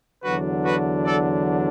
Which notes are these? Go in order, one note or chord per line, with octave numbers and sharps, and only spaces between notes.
E2 D3 F#3 D4 F#4 B4
F#4 B4
A4 D5